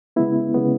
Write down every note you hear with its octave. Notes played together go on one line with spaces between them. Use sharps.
C#3 G#3 B3 E4
C#3 G#3 B3